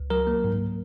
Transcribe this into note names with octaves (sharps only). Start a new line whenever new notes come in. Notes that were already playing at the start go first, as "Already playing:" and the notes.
Already playing: C#2
F#3 A#4
A#3
G#2